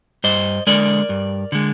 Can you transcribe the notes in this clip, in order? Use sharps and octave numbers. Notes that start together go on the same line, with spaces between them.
G2 C5 D#5
D3 G#3 A#4 D5
G2
D3 G#3